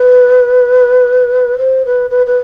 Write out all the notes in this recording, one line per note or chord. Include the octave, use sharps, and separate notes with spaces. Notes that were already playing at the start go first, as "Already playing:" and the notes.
Already playing: B4
C5
B4
B4
B4